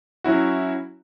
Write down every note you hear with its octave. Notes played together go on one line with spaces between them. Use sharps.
F#3 C#4 E4 F#4